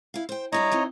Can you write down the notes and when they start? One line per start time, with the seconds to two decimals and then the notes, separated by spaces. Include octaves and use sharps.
0.14 E4 F5
0.29 C5 G5
0.52 G3 D4 E4 C#5 D#5 A#5
0.72 E3 C4 D#4